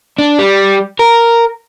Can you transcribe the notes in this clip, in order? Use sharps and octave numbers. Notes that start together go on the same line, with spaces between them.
D4
G3
A#4